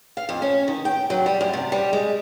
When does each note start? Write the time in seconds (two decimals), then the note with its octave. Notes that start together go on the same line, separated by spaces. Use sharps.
0.17 F5
0.29 F2
0.42 C#4
0.68 D#3
0.85 G5
1.10 F#3
1.26 G3
1.41 F#2
1.54 C3
1.72 G3
1.93 G#3